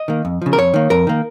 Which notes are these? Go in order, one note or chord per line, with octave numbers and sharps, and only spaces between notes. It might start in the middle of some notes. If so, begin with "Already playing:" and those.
Already playing: D#5
D#3 A#3
F2
C#3 F3
A#4
F2 C#5
D#3 A#3
F2 A#4
D#3 A#3